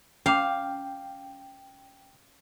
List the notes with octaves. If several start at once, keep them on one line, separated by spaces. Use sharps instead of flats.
C#4 F5 G5 A#5 D6